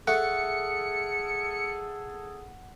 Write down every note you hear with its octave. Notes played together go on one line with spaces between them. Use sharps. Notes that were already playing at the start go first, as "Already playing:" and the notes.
A3 G#4 A4 F#5 C#7